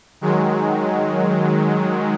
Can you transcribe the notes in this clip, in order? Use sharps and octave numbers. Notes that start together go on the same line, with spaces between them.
D#3 F#3 G#3